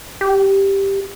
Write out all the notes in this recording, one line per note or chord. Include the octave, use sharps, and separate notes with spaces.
G4